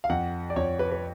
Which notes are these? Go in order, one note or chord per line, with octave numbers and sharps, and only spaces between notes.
F5
F2 F#5
D5
F2 C#5
B4
B4